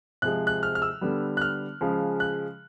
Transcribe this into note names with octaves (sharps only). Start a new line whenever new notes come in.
C3 F3 G#3 F#6
F#6
F6
F6
E6
D3 G3 B3
F#6
F6
C#3 F3 G#3
F#6